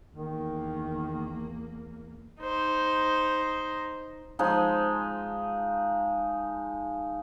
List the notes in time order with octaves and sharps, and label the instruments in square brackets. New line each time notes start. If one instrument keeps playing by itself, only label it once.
[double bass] E2 A#3 [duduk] D#3
[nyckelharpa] D#4 C5
[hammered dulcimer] F3 G#3 D#4